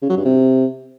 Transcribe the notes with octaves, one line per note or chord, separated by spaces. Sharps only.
C#3
F#3
G2
C3